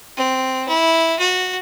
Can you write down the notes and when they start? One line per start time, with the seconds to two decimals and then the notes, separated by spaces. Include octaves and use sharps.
0.17 C4
0.68 E4
1.19 F#4